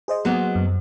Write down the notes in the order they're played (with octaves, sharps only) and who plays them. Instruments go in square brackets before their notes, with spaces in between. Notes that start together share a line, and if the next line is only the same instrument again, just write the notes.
[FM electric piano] G#4 C5 D#5
[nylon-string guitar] F#3 A#3 B3
[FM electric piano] F#2